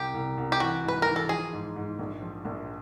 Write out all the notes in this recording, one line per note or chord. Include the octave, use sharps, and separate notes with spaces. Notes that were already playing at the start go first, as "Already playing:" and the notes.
Already playing: C2 G4
C2
C2
G4
E3 F#4
G#2 B4
E3 A#4
A4
F3 G#4
G#2
G#2
A#1
F3
A#1